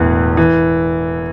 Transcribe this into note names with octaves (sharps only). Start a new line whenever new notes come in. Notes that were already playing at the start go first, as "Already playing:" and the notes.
Already playing: E1 E2 A2 E3
E3